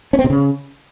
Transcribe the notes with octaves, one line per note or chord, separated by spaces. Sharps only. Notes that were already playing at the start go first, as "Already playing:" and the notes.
C#4
C4
C3
C#3